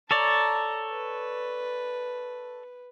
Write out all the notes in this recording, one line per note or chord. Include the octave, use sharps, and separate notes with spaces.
A4 C#5 D5 A5 A#5
B4